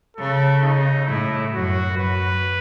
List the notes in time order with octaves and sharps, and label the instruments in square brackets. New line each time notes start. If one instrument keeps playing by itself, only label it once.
[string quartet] C#3 [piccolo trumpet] A4
[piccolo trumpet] D#4
[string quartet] A2 [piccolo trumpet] E4
[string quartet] F#2 [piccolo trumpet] F#4
[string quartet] F#2 [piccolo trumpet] B4